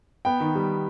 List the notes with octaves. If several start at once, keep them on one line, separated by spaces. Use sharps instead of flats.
B3 G5
D#3
G3